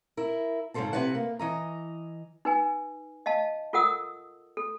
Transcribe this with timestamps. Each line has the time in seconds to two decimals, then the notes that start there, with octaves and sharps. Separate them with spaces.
0.17 E4 A#4
0.74 G#2 C#3 G#3 A4 C5 A5
0.93 C3 E4 B4 F#5
1.15 A#3
1.39 E3 D#5 A#5
2.45 D#4 B4 G#5
3.26 D#5 F5 A5
3.73 F4 A4 A#4 F#5 D#6 E6
4.57 A4